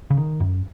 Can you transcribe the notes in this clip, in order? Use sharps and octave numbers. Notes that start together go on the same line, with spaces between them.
C#3
D#3
F#2